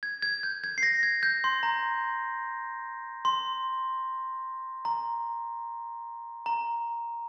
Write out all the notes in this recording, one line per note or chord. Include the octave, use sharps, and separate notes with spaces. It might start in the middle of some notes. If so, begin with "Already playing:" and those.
G#6
G#6
G6
G#6
C7
A#6
G#6
G6
C6
A#5
C6
A#5
A#5